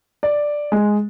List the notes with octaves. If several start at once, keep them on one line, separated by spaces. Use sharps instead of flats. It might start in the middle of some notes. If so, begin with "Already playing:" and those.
D5
G#3